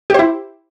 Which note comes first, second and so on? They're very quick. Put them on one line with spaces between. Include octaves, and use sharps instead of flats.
G4 C5 E4